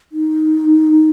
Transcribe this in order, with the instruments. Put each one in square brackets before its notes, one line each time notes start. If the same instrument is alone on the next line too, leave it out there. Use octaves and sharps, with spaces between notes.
[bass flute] D#4